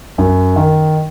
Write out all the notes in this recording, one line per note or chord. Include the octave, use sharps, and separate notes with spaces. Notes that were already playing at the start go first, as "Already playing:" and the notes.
F#2
D#3